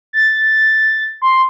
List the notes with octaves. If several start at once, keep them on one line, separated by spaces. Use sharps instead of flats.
A6
C6